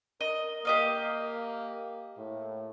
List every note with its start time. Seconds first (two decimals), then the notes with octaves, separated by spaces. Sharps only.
0.21 A#4 D#5
0.65 A#3 G4 D#5 F5
2.18 A2